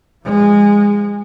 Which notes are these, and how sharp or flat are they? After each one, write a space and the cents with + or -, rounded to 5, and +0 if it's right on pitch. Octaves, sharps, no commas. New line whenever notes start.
F3 -10 G#3 -20